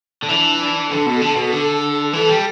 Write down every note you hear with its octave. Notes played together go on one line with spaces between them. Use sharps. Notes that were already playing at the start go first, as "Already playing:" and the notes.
D3
E3 D4
D4
D3 A4
B2
D3
B2
D3
E3 A4
G3